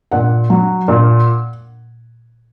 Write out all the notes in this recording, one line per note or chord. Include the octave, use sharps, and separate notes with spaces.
A#2 F#5
F#3
A#2